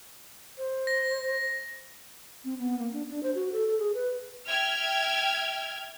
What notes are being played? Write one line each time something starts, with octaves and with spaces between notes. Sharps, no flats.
C5
A#6
C4
B3
A#3
D4
D4
C5
F#4
A4
A4
G#4
B4
E5 G5 F6 G#6